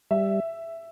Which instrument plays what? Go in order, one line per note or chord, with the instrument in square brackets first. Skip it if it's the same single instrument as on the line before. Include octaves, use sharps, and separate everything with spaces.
[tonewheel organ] G3 [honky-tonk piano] E5